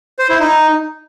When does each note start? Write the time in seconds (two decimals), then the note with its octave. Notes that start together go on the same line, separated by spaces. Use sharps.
0.19 C5
0.29 E4
0.40 D#4